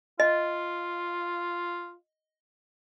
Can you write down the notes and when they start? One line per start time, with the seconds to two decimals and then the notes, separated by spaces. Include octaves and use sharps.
0.20 F4 D#5